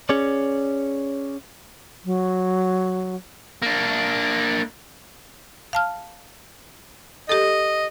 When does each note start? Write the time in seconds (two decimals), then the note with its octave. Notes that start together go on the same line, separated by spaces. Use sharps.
0.09 C#4 G#4 C#5 D5
2.05 F#3
3.62 A#3 D4
5.73 F5 A5 F6
7.29 G4 A4 D#5